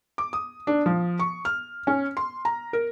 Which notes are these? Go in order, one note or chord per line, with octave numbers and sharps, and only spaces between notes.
D6
D#6
D4
F3
C#6
F6
C#4
C6
A#5
A#4